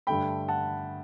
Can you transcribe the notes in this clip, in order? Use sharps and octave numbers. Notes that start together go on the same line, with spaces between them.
G2 D3 A3 G5 B5
F#5 A5